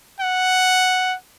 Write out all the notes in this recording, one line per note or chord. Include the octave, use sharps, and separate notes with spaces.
F#5